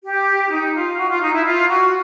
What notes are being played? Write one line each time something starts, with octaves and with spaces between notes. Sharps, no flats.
G4
D#4
F4
F#4
F4
D#4
E4
F4
F#4